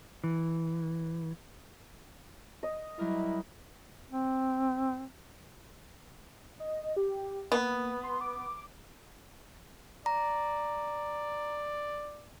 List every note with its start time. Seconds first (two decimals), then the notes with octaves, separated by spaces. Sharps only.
0.24 E3
2.63 D#5
2.99 F#3 G3 E4 A#4
4.10 C4
6.60 D#5
6.96 G4
7.52 A#3 B3
8.03 C6
8.21 D6
10.06 D5 A#5